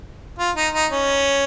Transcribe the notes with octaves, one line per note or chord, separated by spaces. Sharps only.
F4
D#4
D#4
C#4